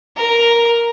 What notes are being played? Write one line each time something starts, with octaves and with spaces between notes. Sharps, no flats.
A#4